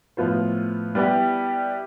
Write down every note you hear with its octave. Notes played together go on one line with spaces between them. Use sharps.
A2 F3 B3 F4 C5
G3 B3 E4 G4